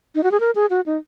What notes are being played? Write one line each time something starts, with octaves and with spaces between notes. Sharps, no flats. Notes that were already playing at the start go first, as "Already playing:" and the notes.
D#4
F#4
G#4
A#4
G#4
F#4
D#4